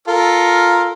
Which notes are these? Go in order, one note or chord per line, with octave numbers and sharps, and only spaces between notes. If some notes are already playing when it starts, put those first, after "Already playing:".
F4 A4 A#4